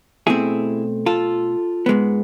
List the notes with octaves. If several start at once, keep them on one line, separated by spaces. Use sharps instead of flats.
B2 A3 C4 E4 G#4
F4 A4
G#2 G#3 B3